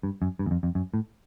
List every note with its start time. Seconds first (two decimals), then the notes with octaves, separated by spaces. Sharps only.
0.03 G2
0.22 F#2
0.39 G2
0.46 E2
0.51 F2
0.63 F2
0.75 F#2
0.94 A2